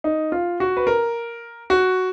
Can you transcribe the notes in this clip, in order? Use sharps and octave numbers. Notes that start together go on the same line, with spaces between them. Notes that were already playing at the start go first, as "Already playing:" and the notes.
D#4
F4
F#4
B4
A#4
F#4